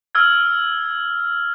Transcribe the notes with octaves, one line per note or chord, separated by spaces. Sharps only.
E6 F6 G#6